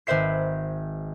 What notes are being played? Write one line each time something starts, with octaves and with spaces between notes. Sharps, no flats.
G#1 B4 C5 E5 C7